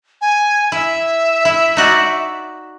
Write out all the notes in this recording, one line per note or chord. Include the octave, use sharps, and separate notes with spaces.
G#5
E4 E5
E4
D#4 F#4 D5